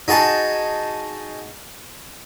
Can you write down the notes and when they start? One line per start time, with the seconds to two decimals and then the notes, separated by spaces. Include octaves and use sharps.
0.08 D#4 F#4 G#4 A5